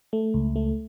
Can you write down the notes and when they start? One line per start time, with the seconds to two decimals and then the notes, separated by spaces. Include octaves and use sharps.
0.13 A3
0.34 C#2
0.56 A3